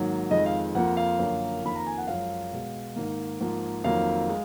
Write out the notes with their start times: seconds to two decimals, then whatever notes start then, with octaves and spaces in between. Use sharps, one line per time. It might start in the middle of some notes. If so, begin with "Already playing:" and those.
Already playing: G#2 D#3 F#3 A#3
0.31 F2 D#3 G#3 D#5
0.46 F5
0.75 F2 F3 A#3 F#5
0.97 F5
1.19 F#2 D3 F3 A#3
1.63 F2 D#3 A#3 B5
1.76 A#5
1.86 G#5
1.98 F#5
2.07 F#2 F3 G#3 F5
2.52 B2 G#3
2.96 G#2 D#3 A#3
3.40 G#2 F3 A#3
3.84 F2 D#3 F#3 A#3 F5
4.29 G#3